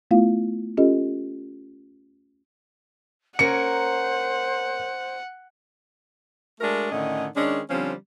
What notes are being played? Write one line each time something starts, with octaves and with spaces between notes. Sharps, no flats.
A3 B3 E4 F4 F5
C#4 F4 G4 A4 D#5
A#3 C#4 A#4 C5 F#5 C#7
G#3 A3 D4 F#4 A#4
A2 D3 D#3 C#4 D#5
D#3 G#3 C#4 D4
D3 F3 G3 C4 C#4